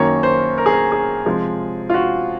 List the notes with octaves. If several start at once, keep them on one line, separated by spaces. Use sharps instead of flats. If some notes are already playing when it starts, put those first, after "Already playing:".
Already playing: F#2 D#3 A#3 C#5
C5
A#4
G#4
A#4
G#4
C3 F3 G#3
F4
F#4